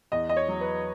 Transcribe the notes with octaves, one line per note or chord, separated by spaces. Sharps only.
E2 D#5
D#5
C#5
F#3
B4